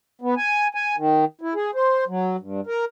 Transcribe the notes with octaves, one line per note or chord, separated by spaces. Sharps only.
B3
G#5
G#5
D#3
E4
G#4
C5
F#3
G2
A#4